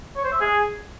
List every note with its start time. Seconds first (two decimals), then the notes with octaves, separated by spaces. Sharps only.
0.16 C#5
0.24 C5
0.33 E5
0.41 G#4